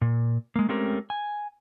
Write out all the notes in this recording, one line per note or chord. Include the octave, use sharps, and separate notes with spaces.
A#2
G#3 A#3
G#3 A3 C4 C#4 G4 A#4
G#5